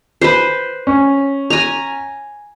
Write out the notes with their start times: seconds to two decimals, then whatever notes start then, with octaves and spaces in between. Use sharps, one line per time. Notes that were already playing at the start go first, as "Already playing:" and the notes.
0.21 B4 C5
0.87 C#4
1.50 G#5 A#5